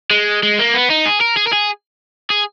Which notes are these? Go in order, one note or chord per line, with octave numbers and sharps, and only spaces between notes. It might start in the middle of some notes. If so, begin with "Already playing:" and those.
G#3
G#3
A#3
B3
D#4
G#4
A#4
G#4
A#4
G#4
G#4